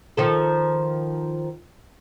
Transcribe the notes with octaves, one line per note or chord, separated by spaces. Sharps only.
D#3 F3 A4